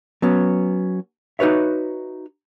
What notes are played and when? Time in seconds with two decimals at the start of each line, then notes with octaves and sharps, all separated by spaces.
0.22 F#3 B3 C#4
1.39 D#4 F#4 B4 C#5 E5